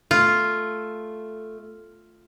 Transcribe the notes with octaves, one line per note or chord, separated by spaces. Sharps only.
A3 F4